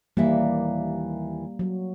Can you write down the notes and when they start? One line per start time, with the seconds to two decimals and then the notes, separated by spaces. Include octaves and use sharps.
0.17 D#2 E3 G3 A#3 E5
1.59 F#3